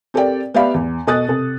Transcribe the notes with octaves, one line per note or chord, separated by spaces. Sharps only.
C4 G4 A4 A#4 D5 G5
B3 G4 D5 E5 F5 B5
E2
B2 A4 D#5 D#6 F#6 A6
C3 A4